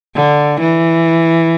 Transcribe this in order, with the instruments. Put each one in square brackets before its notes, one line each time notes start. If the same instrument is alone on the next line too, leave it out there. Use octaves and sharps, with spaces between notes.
[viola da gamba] D3
E3